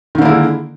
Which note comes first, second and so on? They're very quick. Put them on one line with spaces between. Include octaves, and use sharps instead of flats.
D#3 D3 A#3 E4 G#3